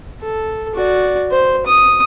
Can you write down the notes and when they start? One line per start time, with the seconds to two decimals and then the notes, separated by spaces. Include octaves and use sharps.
0.22 A4
0.75 F#4 D5
1.31 C5
1.66 D#6